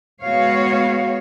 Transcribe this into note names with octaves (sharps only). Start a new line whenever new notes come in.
G#3 B3 F#4 C#5 F5